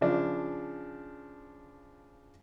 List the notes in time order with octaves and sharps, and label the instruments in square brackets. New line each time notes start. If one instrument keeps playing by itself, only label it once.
[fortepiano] C#3 F3 D4